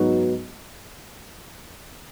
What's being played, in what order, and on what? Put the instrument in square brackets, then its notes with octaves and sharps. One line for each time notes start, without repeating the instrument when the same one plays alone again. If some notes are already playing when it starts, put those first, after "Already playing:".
Already playing: [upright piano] G#2 F#3 B3 D#4 F#4